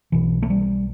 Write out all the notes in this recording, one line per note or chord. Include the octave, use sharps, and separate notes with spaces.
B1 B2 E3
A3
G3